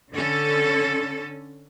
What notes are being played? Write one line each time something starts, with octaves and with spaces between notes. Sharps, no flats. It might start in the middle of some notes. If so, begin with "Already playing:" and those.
D3 C#4 A4